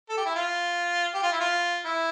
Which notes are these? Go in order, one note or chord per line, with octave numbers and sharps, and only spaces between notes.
A4
G4
E4
F4
G4
F4
E4
F4
E4